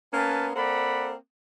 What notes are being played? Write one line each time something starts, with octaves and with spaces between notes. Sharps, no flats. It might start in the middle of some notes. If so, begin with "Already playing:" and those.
A#3 B3 C#4 B4 G#5 A5
A#3 C4 A4 D5 F#5 B5